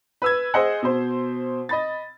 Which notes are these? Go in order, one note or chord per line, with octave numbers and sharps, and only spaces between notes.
B4 E6 G#6
G#4 C5 D#5 F#5
B2 C5
D#5 B5 A6